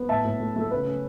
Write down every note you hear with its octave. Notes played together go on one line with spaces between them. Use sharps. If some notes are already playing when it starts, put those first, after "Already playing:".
Already playing: B3
A2 E5 A5
A2
A3
A3 A4
C#3 B4
C#4